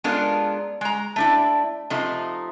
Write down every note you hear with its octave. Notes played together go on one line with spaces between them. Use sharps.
G#3 B3 D4 F4 A4 A#4
G#3 A#5
A3 D4 E4
C3 F3 A3 D#4